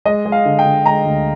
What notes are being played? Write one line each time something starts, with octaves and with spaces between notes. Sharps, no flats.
G#3 D#5
G#3
F5
D3
G5
D3
G#3 A#5
D2